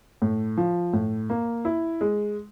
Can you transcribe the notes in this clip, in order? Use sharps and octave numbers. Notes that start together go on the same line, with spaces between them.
A2
F3
A2
A#3
E4
G#3